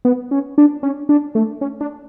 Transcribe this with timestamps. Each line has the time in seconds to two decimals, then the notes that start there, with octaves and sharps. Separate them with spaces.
0.05 B3
0.31 C#4
0.58 D4
0.83 C#4
1.09 D4
1.35 A3
1.61 C#4
1.81 D4